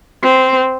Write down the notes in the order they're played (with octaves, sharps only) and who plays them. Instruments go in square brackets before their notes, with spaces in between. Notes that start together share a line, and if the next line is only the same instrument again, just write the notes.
[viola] C4